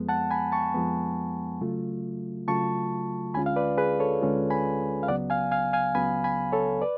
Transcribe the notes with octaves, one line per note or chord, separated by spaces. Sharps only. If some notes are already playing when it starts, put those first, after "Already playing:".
Already playing: F2 F3 G#3 B3
F#5 A5
G#5 B5
A5 C#6
F2 F3 G#3 B3
C#3 F#3 A3 F4
C#3 F#3 A3 F4 A5 C#6
D2 D3 G#3 C#4 F4 G#5 B5
F5
B4 D5
G#4 B4
A4 C#5
D2 D3 G#3 C#4 F4
G#5 B5
F5
C#2 C#3 F#3 B3 D5 F#5
F5 G#5
F5 G#5
F5 G#5
C#2 C#3 F#3 B3 G#5 B5
G#5 B5
A4 C#5
B4 D5